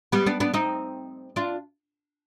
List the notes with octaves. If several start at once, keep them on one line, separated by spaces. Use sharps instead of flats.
G3 B3
B3 D4
B3 D4
C4 D#4
D4 F4